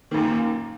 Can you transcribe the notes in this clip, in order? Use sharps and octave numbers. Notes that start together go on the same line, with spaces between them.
F#2 A#2 D#3